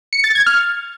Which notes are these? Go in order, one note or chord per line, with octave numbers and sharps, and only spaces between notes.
C#7
A6
G#6
F6